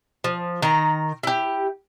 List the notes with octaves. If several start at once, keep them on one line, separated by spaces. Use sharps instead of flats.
F3
D#3 A#5
E4 G4